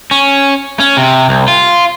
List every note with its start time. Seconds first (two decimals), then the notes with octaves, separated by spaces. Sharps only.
0.11 C#4
0.80 C#4
0.97 C3
1.29 C2
1.48 F4